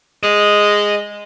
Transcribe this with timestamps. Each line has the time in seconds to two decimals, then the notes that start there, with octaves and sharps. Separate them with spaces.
0.23 G#3 D#5